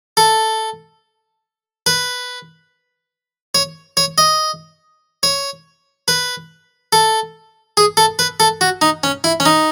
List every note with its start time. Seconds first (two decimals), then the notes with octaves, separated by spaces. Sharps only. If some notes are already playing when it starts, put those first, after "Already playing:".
0.17 A4
1.86 B4
3.55 C#5
3.97 C#5
4.18 D#5
5.23 C#5
6.08 B4
6.93 A4
7.77 G#4
7.97 A4
8.19 B4
8.40 A4
8.61 F#4
8.81 D#4
9.04 C#4
9.24 E4
9.40 C#4
9.46 D#4